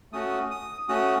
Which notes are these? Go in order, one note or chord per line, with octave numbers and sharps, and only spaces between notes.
A3 C#4 F#4 D#6
D#6
A3 C#4 F#4 D#6